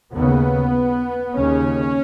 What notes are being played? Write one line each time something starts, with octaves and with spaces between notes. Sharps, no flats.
D#2 C#3 B3
D#2 C#3 C#4